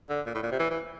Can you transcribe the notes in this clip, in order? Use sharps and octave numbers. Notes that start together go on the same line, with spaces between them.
D3
A#2
A2
A#2
C3
E3
E3